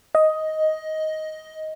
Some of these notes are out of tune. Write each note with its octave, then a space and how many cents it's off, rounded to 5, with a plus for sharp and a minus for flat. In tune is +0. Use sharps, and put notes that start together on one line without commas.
D#5 +10